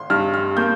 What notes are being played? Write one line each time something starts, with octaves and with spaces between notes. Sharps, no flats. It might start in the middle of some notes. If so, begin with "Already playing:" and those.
Already playing: G#1 C6
G2 F6
F6
A#3 G6